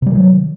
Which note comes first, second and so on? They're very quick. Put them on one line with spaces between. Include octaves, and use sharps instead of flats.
C3 G3 D#3 F#3